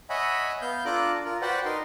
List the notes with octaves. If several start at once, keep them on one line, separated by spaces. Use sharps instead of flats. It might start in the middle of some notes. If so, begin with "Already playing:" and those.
C#5 D#5 E5 F#5 G#5 B5
B3 F5 G6
D4 F4 A4 A#5 D6 F#6
F4 A#4
F#4 B4 C5 D5 F#5 G5
D#4 A#4 C6